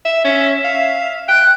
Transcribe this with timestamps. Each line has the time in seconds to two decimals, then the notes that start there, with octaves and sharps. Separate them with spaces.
0.05 E5
0.24 C#4 E5
0.64 F5
1.28 G5 F#6